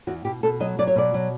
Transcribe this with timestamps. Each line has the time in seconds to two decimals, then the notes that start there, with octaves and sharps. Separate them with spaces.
0.07 E2 F#4
0.25 B2 G4
0.43 B2 A4
0.60 F#3 D#5
0.79 F#3 D5
0.87 C#5
0.96 B2 D5
1.14 F#3